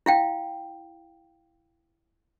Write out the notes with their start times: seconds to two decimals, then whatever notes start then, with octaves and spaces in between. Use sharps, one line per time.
0.06 E4 F5 G5